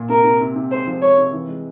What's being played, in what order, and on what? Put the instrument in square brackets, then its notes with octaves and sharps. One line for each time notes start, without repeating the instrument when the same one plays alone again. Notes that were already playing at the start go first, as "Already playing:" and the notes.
Already playing: [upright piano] A#2
[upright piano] C3 [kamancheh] A#4
[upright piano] C3
C3
C3
[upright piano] G#3 [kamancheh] C5
[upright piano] F3
[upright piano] G#3 [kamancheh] C#5
[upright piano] C3
E3
G#3